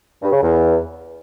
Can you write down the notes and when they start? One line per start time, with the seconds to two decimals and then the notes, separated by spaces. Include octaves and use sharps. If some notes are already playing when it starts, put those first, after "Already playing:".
0.23 G2
0.32 C#3
0.42 E2